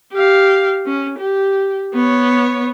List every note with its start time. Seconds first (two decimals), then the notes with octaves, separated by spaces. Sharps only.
0.12 G4 F5
0.86 C#4
1.18 G4
1.94 B3 C#5